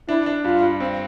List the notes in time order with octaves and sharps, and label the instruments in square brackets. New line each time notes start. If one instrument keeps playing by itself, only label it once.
[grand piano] D4 [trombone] E4
[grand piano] D4
[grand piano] G2 [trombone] F4
[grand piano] G2
C4